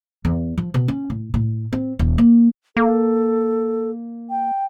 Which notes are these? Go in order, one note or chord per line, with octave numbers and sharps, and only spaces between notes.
E2
F3
B2
C#4
A2
A2
C4
D#1
A#3
A#3 A4
G5